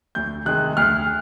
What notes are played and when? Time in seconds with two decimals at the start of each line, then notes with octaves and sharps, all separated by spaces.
0.15 D2 G6
0.46 C3 D#3 G#3 F#6
0.77 D2 F6